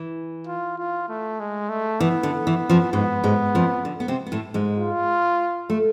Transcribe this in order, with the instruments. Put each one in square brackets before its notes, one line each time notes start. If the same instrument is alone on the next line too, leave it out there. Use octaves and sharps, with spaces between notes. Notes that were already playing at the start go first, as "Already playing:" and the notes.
Already playing: [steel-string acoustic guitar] E3
[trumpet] F4
F4
A3
G#3
A3
[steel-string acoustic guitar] E3 [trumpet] B3
[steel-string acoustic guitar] D3
E3
F2 F3
[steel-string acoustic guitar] G#2 G#3 [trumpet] B3
[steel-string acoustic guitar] G#2 G#3
F2 F3
D3
B3
C3 C4
B3
A2 A3
G#2 G#3
[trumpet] F4
[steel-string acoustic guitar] A3